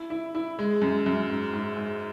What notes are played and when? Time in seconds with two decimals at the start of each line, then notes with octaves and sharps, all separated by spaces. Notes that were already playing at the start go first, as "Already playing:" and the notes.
Already playing: E4
0.10 E4
0.35 E4
0.59 G#3
0.82 F#2
1.06 F#2
1.29 G#2
1.53 G#2
1.76 G#2